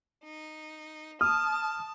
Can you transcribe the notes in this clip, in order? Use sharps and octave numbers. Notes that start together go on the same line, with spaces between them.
D#4
A5 D#6 F6